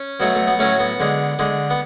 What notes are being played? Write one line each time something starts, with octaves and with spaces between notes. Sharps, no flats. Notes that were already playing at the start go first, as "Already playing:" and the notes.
Already playing: C#4
B2 F#3 A3
A3
B3
A2 F#3 A3 C#4
B3
D3 G#3
D3 G#3
B3